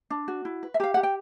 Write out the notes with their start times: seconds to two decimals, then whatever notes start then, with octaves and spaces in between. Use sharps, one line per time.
0.10 D4
0.28 F#4
0.45 E4
0.63 B4
0.74 E5
0.80 G4 F5
0.94 G4 F#5
1.03 G5